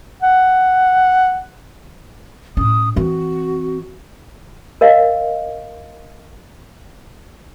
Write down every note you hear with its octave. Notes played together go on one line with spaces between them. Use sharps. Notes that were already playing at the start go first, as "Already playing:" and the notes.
F#5
A2 C#4 D#6
E3 C4 F#4
A#4 D#5 F5